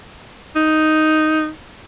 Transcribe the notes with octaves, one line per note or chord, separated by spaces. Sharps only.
D#4